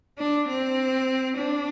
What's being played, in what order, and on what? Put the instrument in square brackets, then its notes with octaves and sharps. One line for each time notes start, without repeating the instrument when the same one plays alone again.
[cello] D4
C4
D4